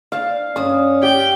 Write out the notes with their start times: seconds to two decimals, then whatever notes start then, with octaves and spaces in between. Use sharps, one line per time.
0.12 D4 C5 F5 A5
0.56 G2 C#4 D4 D#6
1.03 G4 G5